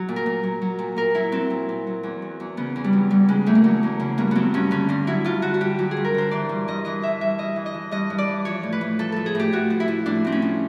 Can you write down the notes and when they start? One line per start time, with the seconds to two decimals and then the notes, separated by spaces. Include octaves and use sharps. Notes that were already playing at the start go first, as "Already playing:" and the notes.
Already playing: F#3
0.08 A#2
0.16 A#4
0.26 A#2
0.43 F#3
0.62 F#3
0.79 A#2
0.96 A#2 A#4
1.15 F#3 E4
1.32 F#3 C4
1.50 A#2
1.69 A#2
1.87 F#3
2.03 E2
2.22 F#3
2.40 E2
2.57 C#3 B3
2.76 E2
2.84 G3
2.93 F#3
3.10 E2 G3
3.28 C#3 G#3
3.46 E2 A3
3.55 A#3
3.64 F#3 A3
3.83 E2
3.99 C#3
4.18 G2 A#3
4.31 F#3 B3 C4
4.54 G2 C#4
4.71 D3 C#4
4.89 G2 D4
5.07 F#3 E4
5.24 G2 F4
5.42 D3 F#4
5.54 F#4
5.60 G2 G4
5.79 F#3 G4
5.91 G#4
5.97 G2
6.05 A#4
6.14 D3 C5
6.31 E3 D5
6.49 G2
6.68 G2 D#5
6.85 E3 D#5
7.03 E3 E5
7.21 G2 E5
7.38 G2 D#5
7.56 E3
7.66 D#5
7.74 E3
7.91 G2 D#5
8.10 G2
8.18 D5
8.28 E3
8.45 F3 C#5
8.63 A2
8.73 B4
8.81 A2
8.99 F3 A4
9.12 F3 A4
9.26 G#4
9.35 A2 G4
9.53 A2 F#4
9.70 F3
9.80 E4
9.88 F3
10.06 A2 D4
10.25 A2 C4
10.32 C#4
10.42 F3